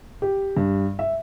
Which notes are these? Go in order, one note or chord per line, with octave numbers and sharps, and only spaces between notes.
G4
G2
E5